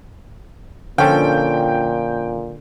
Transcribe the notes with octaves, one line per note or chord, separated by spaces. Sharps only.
A#2 D3 F3 C#4 D4 A4 G5